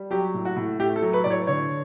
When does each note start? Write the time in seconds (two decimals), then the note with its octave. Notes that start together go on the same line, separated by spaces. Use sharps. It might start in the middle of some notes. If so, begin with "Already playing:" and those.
Already playing: G3
0.11 F#3 G4
0.34 A2
0.45 F#4
0.56 A2
0.79 A3 G4
0.96 A4
1.02 F#3
1.13 B4
1.24 A2 D5
1.30 C#5
1.47 D3 C#5